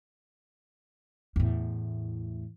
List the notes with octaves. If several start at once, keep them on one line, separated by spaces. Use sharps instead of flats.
E2 A2